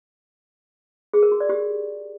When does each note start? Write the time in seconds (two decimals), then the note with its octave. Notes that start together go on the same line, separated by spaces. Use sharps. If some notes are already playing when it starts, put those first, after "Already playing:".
1.14 G#4
1.23 A#4
1.31 F#4
1.40 D5
1.49 G4